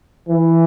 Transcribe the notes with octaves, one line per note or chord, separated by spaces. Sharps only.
E3